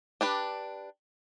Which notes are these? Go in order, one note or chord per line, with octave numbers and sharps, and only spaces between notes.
D4 G4 B4